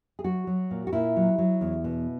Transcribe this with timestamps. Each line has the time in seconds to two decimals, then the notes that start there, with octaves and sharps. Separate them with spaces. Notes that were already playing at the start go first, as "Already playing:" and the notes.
0.19 G#4
0.24 F#3 F#4
0.47 F#3
0.71 A#2
0.87 F#4
0.93 A#2 E4
1.16 F#3
1.38 F#3
1.61 E2
1.84 B2